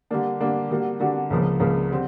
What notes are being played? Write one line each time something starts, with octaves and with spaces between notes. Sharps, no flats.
D3 G3 A#3 D4
D3 G3 A#3 D4
D3 G3 A#3 D4 F#4
D3 G3 A#3 D4 F#4
C#2 C#3 F3 A#3
C#2 C#3 F3 A#3
D3 G3 C4